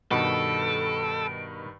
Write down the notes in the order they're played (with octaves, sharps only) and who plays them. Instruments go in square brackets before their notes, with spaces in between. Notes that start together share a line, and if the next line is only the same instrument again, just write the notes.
[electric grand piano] G2 D#3 B5 [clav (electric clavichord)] B2 [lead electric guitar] A4 [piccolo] D7